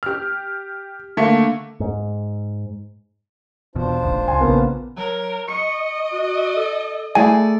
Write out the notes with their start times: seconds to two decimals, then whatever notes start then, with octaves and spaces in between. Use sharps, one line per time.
0.03 G4 F6
1.17 D3 A3 A#3
1.80 G#2
3.75 E2 B2 D4 F4 C5
4.03 D#1 A1 D2
4.28 C#2 G#5 C6
4.40 A#1 C#3 A#3 B3
4.98 F#3 A#4
5.48 D#5 C#6 C#7
6.12 F#4
6.56 A4
7.15 A3 E4 G#4 D5 G#5